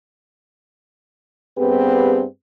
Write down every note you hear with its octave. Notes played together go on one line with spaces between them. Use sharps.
G2 B3 C4 G4 G#4 B4